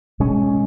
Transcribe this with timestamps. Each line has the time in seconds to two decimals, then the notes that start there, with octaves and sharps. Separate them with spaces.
0.20 B2 G#3 C#4